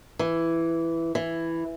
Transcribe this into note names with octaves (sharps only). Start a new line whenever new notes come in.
E3
E3